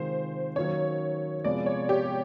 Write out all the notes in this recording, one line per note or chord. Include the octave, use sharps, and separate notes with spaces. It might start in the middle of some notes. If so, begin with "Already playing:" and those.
Already playing: C3 D#3 G#3 C4 F4 C5
D#3 F#3 A#3 C#4 C#5
C3 F3 G#3 B3 D5
C#5
G4